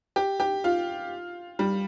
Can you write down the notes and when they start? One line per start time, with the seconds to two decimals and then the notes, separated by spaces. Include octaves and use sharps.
0.16 G4
0.40 G4
0.64 F4
1.59 G3